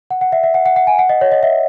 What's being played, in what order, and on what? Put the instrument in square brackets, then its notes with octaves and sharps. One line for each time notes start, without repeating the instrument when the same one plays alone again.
[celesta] F#5
F#5
E5
E5
F#5
F#5
F#5
G#5
F#5
D#5
C#5
D#5
E5